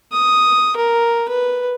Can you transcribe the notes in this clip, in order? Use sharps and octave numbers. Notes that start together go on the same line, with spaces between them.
D#6
A#4
B4